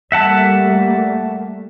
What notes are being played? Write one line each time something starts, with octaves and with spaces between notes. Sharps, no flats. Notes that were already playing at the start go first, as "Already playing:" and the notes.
G3 A3 A#3 E5 F#5 A5